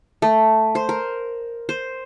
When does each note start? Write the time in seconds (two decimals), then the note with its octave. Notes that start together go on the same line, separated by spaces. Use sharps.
0.22 A3
0.75 C5
0.89 A#4
1.69 C5